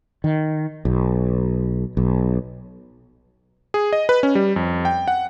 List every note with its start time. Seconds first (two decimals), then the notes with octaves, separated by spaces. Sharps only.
0.24 D#3
0.85 B1
1.97 B1
3.74 G#4
3.93 D#5
4.09 B4
4.23 C#4
4.35 G3
4.56 F2
4.85 G5
5.08 F#5